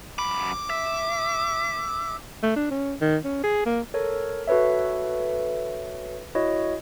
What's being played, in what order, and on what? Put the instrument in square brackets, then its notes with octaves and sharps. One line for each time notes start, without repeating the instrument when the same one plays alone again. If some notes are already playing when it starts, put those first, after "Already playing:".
[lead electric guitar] F#2 B5 [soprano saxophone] D6
[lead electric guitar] E5
[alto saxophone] A3
D4
C#4
D#3
C#4
G#4
A#3
[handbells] A4 A#4 C#5
F#4 A4 B4 C#5 E5
E4 F#4 C#5 D#5